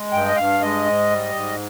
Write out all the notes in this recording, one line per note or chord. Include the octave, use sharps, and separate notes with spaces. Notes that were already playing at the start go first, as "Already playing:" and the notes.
Already playing: G#3
G2 G5
D#5
G2 F5
G#3 D#5
G#2
G3
G#2